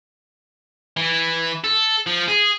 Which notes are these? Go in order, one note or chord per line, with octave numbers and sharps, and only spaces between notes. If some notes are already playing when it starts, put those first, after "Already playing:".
E3
A4
F3
G#4